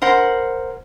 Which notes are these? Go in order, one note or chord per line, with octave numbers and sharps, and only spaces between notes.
A#4 C5 F#5